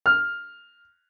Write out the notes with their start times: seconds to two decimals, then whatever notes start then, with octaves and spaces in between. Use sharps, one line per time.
0.06 F6